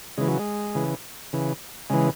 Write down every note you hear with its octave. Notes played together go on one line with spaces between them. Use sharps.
C#3 E3 G#3
F#3
G#3
C#3 E3
C#3 E3
C#3 E3 G#3